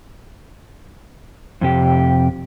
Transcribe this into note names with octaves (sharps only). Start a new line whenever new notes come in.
F2 C3 G4